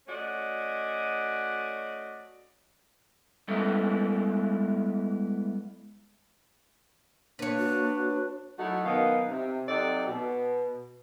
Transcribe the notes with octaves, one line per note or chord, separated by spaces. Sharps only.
A3 C#4 F#4 D5 D#5
G3 G#3 B3 C#4 E4 A4
A#3 D4 B4 C#5
F#4
F#3 A3 D#4 E4 F#4
F#2 B2 D#3 B3 D#4 F5
C3
C3 F#3 D#4 G4 A4 D5
B2